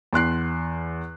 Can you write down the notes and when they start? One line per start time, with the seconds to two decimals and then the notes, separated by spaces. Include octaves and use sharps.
0.13 E2 C6 F#6 C7